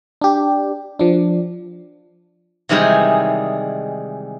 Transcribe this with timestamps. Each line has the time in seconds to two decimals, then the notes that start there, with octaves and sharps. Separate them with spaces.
0.21 D4 G4
0.99 F3 D4
2.69 C3 D#3 E3 G3 G#3 G#4